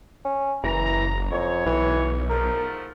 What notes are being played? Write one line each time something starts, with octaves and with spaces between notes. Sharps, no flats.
C#4
F#1 E3 A#5
F2 C#5
B1 E3
G#2 F3 A3 A#4